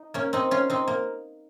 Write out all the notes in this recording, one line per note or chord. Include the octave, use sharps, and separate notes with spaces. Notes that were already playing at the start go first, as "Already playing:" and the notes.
Already playing: D#4
A#3 C#4
C4 D#4
C#4 F4
C4 D#4
A#3